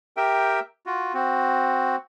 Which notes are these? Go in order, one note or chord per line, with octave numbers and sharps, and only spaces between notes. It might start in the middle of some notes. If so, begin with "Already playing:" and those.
G4 A#4 E5 G5
F4 F#4
C4 F#4